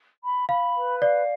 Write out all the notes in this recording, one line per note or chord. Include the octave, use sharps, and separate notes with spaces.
B5
F5 B5
B4
D5 F5